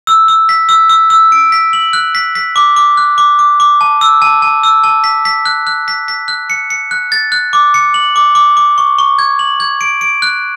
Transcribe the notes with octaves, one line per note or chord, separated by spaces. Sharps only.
E6
E6
B6
E6
E6
E6
D7
B6
F#7
F#6
B6
B6
D6
D6
F#6
D6
D6
D6
A5
E6
A5
A5
E6
A5
B6
B6
F#6
F#6
B6
B6
F#6
C#7
C#7
F#6
A6
F#6
D6
C#7
F#7
D6
D6
D6
C#6
C#6
G#6
F#7
G#6
D7
D7
F#6